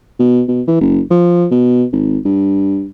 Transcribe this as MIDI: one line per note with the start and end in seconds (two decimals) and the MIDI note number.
0.20 0.43 47
0.48 0.62 47
0.67 0.80 52
0.81 1.01 30
1.11 1.47 53
1.52 1.85 47
1.93 2.18 32
2.25 2.87 43